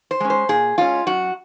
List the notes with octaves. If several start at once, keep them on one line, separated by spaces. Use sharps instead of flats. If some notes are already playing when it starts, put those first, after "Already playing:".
C5
G#3 C#4
C5
A#2 G#4
G#3 C#4 F4
F#2 F#4